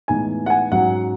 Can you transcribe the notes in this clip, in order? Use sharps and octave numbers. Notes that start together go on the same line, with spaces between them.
A2 E3 G#3 B3 D#4 G#5
F#5
G#5
G#2 F#3 C#4 F#5